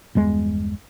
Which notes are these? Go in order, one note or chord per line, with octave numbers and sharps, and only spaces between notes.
G1 E2 G#3